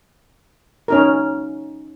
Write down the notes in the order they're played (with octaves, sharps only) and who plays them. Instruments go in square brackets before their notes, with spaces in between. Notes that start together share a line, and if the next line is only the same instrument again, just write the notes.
[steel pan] C#4 D#4 A#4